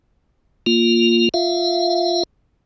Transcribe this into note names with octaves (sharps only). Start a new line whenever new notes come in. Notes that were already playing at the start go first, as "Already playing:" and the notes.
A#3 F4
F4 E5 F5